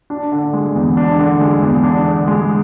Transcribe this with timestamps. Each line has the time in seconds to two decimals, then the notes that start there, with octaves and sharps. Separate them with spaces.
0.10 D4
0.32 D3
0.53 G#3
0.75 E2
0.97 D4
1.19 D3
1.41 G#3
1.63 E2
1.83 D4
2.05 D3
2.28 G#3